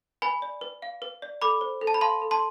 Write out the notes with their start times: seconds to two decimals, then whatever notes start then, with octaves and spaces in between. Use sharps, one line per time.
0.22 B4 G#5 B5
0.42 D5
0.61 B4
0.82 F5
1.02 B4
1.22 D5
1.42 A4 B5 D6
1.61 C5
1.81 A4
1.87 A5
1.94 B5
2.01 F5 A5 C6
2.22 A4
2.31 A5 C6